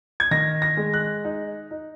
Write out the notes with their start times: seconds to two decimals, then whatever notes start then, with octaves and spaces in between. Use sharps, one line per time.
0.20 G#6
0.31 D#3 A#6
0.62 A#6
0.77 G#3
0.94 F#6
1.25 D#4
1.71 D#4